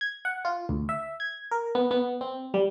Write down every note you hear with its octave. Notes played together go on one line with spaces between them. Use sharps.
G#6
F#5
F4
D2
E5
G#6
A#4
B3
B3
C4
G3